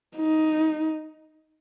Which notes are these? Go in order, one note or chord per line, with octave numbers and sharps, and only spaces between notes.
D#4